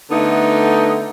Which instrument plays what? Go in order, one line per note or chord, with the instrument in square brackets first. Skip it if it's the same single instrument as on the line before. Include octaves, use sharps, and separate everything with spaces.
[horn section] D3 A3 B3 D#4